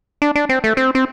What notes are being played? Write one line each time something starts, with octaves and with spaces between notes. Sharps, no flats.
D4
D4
C4
A3
C4
C4